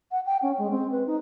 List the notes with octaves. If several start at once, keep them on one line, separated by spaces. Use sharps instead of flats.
F#5
G5
C#4
G#3
C4
B4
D#4